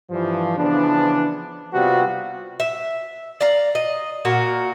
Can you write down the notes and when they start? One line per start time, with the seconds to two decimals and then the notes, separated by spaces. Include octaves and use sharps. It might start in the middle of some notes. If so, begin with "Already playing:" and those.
0.10 G2 E3 F3
0.56 C#3 E3 F3 B3 D4
1.74 C3 G3 B3 C4 F4 F#4
2.60 E5
3.41 D5 F5 A#5
3.75 D#5
4.25 A#2 F#4 A#4